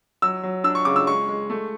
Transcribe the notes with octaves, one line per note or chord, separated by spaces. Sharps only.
F#3 E6
F#3
D4 E6
C#6
C#3 D6
E6
G#3 C#6
G#3
A3